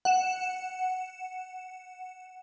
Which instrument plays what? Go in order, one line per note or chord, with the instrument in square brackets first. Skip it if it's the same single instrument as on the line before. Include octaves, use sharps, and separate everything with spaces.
[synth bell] F#5 E7